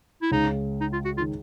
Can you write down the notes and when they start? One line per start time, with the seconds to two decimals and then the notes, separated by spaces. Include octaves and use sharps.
0.22 E4
0.31 C#2 C#3 D#4
0.81 D#4
0.93 F4
1.05 F#4
1.17 D#3 F4